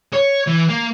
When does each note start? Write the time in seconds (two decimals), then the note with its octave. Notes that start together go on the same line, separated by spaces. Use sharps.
0.13 C#5
0.47 E3
0.69 A#3